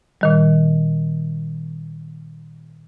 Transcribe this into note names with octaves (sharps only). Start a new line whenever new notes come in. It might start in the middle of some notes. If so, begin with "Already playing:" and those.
A#2 D#3 G3